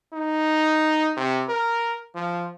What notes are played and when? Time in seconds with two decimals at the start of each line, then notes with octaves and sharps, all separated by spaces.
0.13 D#4
1.17 C3
1.49 A#4
2.15 F3